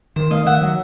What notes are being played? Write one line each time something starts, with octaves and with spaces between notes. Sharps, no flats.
D#3 C5
A3 D#5 F5
D#3 E5 F#5
F#3